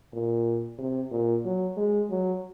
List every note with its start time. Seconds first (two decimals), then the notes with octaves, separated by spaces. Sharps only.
0.13 A#2
0.79 C3
1.11 A#2
1.45 F#3
1.77 G#3
2.10 F#3